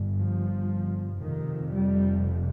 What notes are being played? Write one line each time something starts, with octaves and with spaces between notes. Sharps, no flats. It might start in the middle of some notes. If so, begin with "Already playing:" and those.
Already playing: G1 G2
F3
F1 F2 C3 D#3
G3